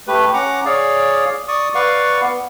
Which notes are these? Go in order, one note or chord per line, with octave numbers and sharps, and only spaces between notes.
A3 G4 B4
C#4 F#5 A#5 D6
G#4 C#5 D5 F5
D5 C#6 D#6
B4 D5 F5 F#5 C#6
B3